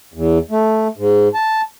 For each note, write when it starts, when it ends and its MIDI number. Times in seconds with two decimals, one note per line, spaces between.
0.14 0.38 40
0.51 0.88 57
0.98 1.28 44
1.34 1.62 81